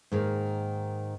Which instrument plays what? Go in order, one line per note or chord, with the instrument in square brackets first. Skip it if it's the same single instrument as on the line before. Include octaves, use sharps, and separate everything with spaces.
[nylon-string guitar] G#2 D#3 A#3